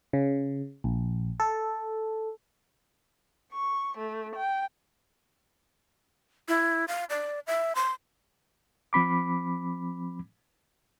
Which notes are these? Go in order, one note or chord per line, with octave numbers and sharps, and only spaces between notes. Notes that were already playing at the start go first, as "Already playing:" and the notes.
C#3
A#1
A4
C#6
A3
G5
E4
F5
D5
E5
C6
F3 C4 B5 D6